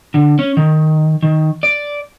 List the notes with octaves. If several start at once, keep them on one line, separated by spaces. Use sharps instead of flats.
D3
C#4
D#3
D#3
D5